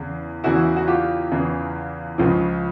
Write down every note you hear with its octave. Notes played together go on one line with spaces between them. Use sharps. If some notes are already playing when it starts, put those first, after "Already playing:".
Already playing: E2 C#3 E3
E2 C#3 E3 E4 F#4
F#4
F4 G4
E2 C#3 E3
C#2 C#3 F3